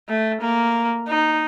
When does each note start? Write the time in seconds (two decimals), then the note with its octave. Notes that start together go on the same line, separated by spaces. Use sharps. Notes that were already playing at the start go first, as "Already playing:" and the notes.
0.09 A3
0.41 A#3
1.08 D#4